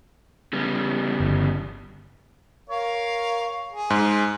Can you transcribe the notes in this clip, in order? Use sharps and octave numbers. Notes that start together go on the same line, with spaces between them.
C#3 G3 B3
G1
A#4 C#5 F5
G#4
G#2